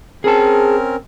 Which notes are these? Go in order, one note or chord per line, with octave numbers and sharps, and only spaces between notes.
C4 C#4 G#4 A#4 A5